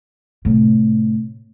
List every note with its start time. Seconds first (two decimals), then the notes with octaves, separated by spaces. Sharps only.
0.45 A2 C3